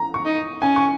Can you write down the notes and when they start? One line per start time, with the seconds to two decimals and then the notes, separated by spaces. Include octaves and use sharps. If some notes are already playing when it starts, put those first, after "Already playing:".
Already playing: A#5
0.14 C#6
0.25 D#4
0.62 C#4 G#5
0.76 C#6